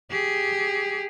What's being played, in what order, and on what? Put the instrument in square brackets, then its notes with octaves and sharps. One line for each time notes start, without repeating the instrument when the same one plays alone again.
[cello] G4 G#4